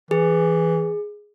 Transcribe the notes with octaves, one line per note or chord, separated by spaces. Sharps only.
E3 G#4